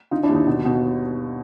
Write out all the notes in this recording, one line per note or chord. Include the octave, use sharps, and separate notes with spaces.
D3 D#4 F4
D4 E4
D#2
D#4
B2 D#4
B2 D#4